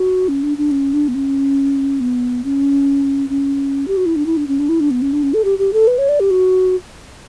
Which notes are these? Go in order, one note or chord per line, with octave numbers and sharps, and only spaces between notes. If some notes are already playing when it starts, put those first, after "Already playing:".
Already playing: F#4
C#4
D4
D4
C#4
D4
B3
C#4
B3
C#4
C#4
G4
F#4
E4
D4
E4
D4
C#4
D4
E4
D4
B3
C#4
D4
C#4
A4
G4
G4
A4
B4
C#5
D5
G4
F#4